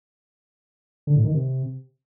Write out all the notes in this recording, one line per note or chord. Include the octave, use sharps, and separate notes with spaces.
D3
A2
D#3
C3